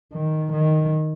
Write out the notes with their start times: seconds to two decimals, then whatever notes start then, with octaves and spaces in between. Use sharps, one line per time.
0.13 D#3
0.53 D#3